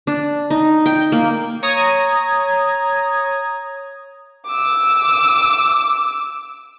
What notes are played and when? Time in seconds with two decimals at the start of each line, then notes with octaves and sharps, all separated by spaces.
0.07 D4
0.50 D#4
0.86 G5
1.12 A#3
1.62 C#5 A#5 D#6 G#6
4.46 D6 E6